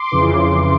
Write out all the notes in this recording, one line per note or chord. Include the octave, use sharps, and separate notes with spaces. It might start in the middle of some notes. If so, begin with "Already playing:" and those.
Already playing: C6 D6
F2 C#3 E3